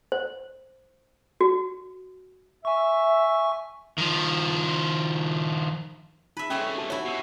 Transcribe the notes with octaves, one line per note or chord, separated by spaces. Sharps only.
C5
F#4
E5 G#5 C#6
D#3 F3
D#4 B4 E5
C2 A3 C#4 G#4 C#5 D#5
G4 A5
D#4 E4 F#4 C#5
B2 G4 E6